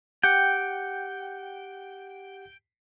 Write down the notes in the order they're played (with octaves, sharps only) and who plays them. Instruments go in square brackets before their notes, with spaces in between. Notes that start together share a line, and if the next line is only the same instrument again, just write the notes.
[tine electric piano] G4 F#5 C#7 [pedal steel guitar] G5